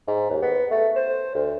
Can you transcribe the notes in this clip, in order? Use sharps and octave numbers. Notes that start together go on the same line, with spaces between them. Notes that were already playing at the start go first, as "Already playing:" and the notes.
G#2
D#2
B3
A3
C5
D2